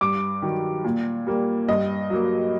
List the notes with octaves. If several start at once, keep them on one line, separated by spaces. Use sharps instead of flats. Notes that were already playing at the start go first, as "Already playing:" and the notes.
G2 D6
D#3 F#3
A#2
G3 A#3
G2 D#5
F#3 A#3